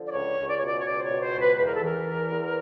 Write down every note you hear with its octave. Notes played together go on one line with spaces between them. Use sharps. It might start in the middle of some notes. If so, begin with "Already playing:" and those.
Already playing: D3 F3
D5
C#2 C#5
C#2
D5
B2 C#5
D5
C#5
C#2 D5
C5
C#5
B2
C5
C#2
B4
E2 B4
A#4
A4
E3 A#4
E2
E2